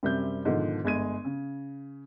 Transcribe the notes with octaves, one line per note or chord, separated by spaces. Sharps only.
F#2 C3 G3 C4 E5 G6
G#2 B2 D3 D#3 F3
G1 G#3 G#6 D#7
C#3